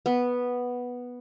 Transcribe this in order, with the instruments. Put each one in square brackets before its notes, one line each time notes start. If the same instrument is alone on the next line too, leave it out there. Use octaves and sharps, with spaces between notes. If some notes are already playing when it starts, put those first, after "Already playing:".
[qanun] B3